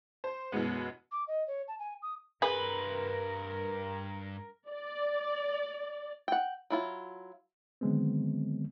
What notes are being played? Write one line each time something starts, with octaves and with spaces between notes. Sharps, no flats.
C5
F#2 B2 E3 G#3 B3
D6
D#5
C#5
A5
G#5
D#6
G2 G#4 A#4 B4 C6
D5
F#5 G5
F#3 E4 F4
D3 D#3 F#3 G#3 B3 C4